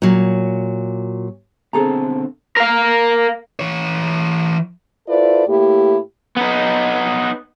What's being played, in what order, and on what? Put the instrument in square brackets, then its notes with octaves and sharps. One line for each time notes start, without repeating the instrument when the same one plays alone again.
[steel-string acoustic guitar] A#2 F#3
[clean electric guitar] B2 D3 C4 [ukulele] G#4 A4 A#5
[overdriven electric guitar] A#4 F5
[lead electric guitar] E3 C#5
[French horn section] E4 F4 A4 B4 C5 D5
A2 A#3 E4 G4
[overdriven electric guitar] B3 D#4